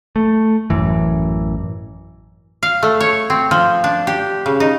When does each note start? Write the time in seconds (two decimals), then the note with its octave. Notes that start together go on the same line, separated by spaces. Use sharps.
0.16 A3
0.70 A1 F#2 E3
2.63 F5
2.83 A3
3.00 C#5
3.30 C4
3.51 F3
3.84 D4
4.07 G4
4.46 C#3
4.60 D#4